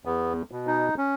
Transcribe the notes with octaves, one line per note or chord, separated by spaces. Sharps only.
E2 B3
B2
D#4
C#4